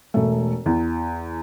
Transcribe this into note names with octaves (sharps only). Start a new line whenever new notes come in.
E1 A3
E2